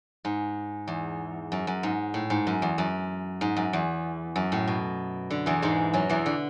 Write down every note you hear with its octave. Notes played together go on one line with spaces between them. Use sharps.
G#2
E2
F#2
F#2
G#2
A2
G#2
F#2
E2
F#2
G#2
F#2
E2
F#2
A2
B2
D3
E2 E3
G#2 G#3
F#2 F#3
E2 E3
D3